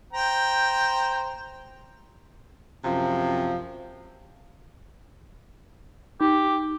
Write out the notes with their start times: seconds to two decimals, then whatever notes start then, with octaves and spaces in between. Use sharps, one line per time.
0.13 C5 G5 A#5
2.84 F#2 C3 F3
6.21 D#4 G4